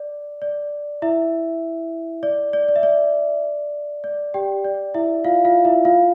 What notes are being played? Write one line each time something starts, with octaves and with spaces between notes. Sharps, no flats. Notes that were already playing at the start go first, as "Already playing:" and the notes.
Already playing: D5
D5
E4 E5
D5
D5
D5
E5
D5
D5
G4 G5
D5
E4 E5
F4 F5
F4 F5
E4 E5
F4 F5